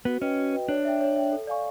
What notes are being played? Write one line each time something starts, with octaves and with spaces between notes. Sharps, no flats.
B3 F#4
C#4 B4 D#5 G5
F#4
B4 D#5 G5
D4 C#5
E5 G5
C#5
E5 G5
A4
D5 F5 G#5 C#6